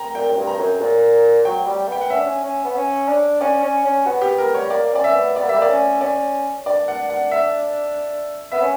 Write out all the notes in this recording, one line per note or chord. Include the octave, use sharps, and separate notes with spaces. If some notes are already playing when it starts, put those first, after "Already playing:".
Already playing: G5 A#5
A#2 G5
F#2
G2
A#5
F#2
A#2
F#3 G5
G3
B3 G5
F#5
C#4 E5
D4
C#4
C#4
B3
C#4
D4
C#4 D5
C#4
C#4
B3 F#4
G4
A#4
G3 C#5
A#3 D5
C#4 D5
E5
B3
B3 D5
A#3
G3 E5
A#3 D5
C#4
C#4 D5
D4 D5
F#5
F#5
E5
B3 E5
C#4